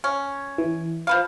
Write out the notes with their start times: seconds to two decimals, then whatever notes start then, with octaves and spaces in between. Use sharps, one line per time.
0.04 C#4
0.58 E3
1.07 F3 B4 F5